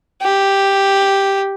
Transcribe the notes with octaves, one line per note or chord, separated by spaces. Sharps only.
G4